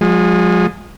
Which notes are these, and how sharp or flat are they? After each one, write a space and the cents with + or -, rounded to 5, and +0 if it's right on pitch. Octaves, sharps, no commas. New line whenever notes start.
F3 +40 G#3 -15